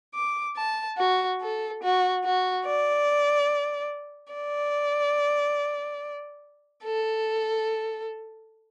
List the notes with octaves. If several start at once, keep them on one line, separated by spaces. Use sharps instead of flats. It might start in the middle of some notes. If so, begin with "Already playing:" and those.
D6
A5
F#4
A4
F#4
F#4
D5
D5
A4